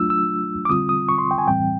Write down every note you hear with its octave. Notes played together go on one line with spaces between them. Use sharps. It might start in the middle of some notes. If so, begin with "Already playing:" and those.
Already playing: F#3 A3 D4 F4 E6
E6
D6
D3 G3 C4 F4 D#6
D#6
C#6
C6
G5
G#5
A2 E3 G3 C4 G5